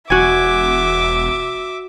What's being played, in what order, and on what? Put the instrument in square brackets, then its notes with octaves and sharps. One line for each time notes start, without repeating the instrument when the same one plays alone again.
[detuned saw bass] E1 [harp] F#4 G#5 [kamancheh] E5 D6